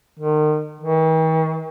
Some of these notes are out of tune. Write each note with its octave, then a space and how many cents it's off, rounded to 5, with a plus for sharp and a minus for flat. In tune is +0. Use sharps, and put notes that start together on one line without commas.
D#3 -35
D#3 +45